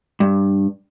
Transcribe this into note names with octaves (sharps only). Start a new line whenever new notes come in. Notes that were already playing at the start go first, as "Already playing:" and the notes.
G2